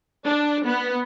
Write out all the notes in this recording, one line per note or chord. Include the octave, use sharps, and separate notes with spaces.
D4
B3